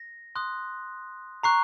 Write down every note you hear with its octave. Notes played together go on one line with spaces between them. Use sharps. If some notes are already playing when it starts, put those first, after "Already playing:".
Already playing: A#6
C6 D#6 F#6
A#5 C#6 F#6 C7